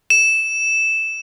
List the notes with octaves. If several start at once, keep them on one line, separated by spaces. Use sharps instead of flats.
E7